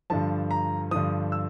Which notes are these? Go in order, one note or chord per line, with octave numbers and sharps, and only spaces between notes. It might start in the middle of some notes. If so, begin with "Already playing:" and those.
G2 D3 F3 A5
A#5
G2 D3 F3 D#6
E6